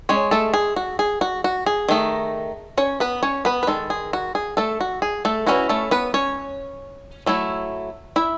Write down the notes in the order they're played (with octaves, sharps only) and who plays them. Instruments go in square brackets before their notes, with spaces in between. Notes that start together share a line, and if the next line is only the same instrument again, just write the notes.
[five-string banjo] G#3 C#4 C#5
A3 A4
G#4
F#4
G#4
F#4
F#4
G#4
D#3 A3 D#4
C#4 C#5
B3 B4
C#4 C#5
B3 B4
B4
D#3 G#3 A4
G#4
F#4
G#4
A3 A4
F#4
G#4
A3 A4
E3 G#3 C#4 E4 F#4
A3 A4
B3 B4
C#4 C#5
F#3 A3 E4
E4 E5